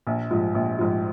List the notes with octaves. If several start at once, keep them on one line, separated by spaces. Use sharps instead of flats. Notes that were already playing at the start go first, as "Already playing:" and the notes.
A#1
G#2 F3
A#1
G#2 F3